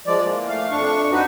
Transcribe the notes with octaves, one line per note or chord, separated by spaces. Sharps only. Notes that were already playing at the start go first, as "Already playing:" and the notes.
F3 G#3 D5
E3 A#3
A3 F5
F2 D4 C#6
D4 D#4 F#4 B4